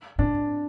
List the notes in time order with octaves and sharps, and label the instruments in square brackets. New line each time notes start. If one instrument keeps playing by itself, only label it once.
[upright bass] A2 [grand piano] D4